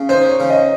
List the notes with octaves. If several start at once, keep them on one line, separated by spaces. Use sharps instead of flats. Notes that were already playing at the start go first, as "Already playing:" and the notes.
Already playing: C#3
D#4 C5
C#5
C#3
D#5